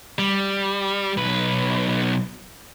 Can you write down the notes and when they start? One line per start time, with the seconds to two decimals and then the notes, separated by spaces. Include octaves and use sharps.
0.19 G3
1.18 B1 B4